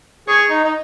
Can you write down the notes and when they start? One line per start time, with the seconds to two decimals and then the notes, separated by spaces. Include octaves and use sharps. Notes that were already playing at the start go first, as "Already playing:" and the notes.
0.28 G#4 C#5
0.50 D#4
0.64 D#4